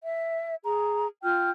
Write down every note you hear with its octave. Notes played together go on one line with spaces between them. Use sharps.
E5
G#4 A#5
F4 G5 F6 G6